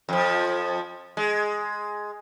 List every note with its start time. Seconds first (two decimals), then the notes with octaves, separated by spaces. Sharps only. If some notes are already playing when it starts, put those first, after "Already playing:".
0.09 F2 F3
1.17 G#3